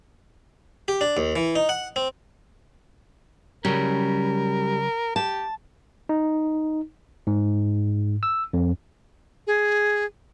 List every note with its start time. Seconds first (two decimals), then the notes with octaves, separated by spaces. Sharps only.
0.88 G4
1.01 D4
1.17 D#2
1.36 E3
1.56 D#4
1.69 F#5
1.96 C4
3.65 C#3 F#3 G3 C#4 A#4
5.16 G4 A5
6.09 D#4
7.27 G#2
8.23 E6
8.53 F2
9.47 G#4